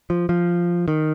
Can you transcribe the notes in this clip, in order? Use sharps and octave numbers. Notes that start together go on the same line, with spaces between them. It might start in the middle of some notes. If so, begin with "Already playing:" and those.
F3
F3
D#3